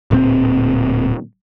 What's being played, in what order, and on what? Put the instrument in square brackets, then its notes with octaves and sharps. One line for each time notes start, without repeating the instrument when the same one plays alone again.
[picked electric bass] D1 A#2 B3 C4